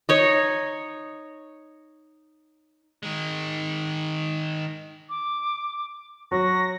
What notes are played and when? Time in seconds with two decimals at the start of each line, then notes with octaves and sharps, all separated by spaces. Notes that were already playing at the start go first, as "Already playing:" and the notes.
0.09 D#4 C#5 D#5
3.03 D#3 G#3
5.09 D6
6.32 F#3 F#4 A#6